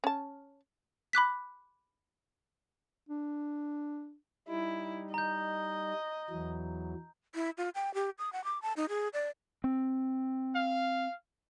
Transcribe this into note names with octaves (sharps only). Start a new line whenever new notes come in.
C#4 A5
B5 D6 F#6 B6
D4
G3 D#4 E4
D#5 A#5 G6
E2 E3 F#3
E4
F4
G5
G4
D#6
F#5
D6
A5
D#4
G#4
D5
C4
F5